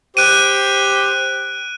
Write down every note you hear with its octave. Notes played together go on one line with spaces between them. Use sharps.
G4 C5 F#6 D7 D#7